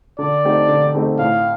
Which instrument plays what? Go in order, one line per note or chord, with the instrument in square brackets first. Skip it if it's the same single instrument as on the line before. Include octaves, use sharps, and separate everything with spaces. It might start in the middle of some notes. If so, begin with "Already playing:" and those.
[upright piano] D3 [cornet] D5
[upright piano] A3 C4 D#4 G4
D3
A3 C4 D#4 G4
[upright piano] A2 [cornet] F5